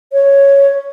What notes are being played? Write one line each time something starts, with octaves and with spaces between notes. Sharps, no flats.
C#5